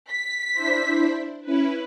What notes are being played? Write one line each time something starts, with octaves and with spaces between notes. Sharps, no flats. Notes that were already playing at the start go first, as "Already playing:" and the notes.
B6
D4 E4 C5
C#4 E4 B4